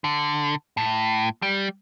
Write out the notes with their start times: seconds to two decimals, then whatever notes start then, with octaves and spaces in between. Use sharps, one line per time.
0.04 D3
0.77 A2
1.42 G3